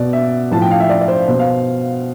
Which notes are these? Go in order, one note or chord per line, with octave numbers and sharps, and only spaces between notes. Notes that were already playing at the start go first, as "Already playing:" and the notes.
Already playing: B2 D5
E5
A2 F3 A5
G5
F5
E5
D5
D5
C5
B2 C5
F5